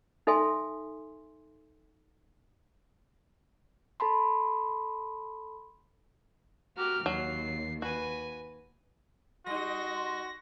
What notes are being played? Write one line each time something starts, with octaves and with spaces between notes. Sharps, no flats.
D#4 A4 E5 G#5 C6
A4 A5 B5 C6
F#4 G4 A#4 F6
D#2 F#3 C7
F#4 B4 G#5
G3 D#4 F#4 C6 A#6